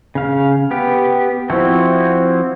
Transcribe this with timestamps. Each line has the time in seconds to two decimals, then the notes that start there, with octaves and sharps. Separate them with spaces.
0.15 C#3 F5
0.71 B3 G4
1.50 F3 C4 E4 F#4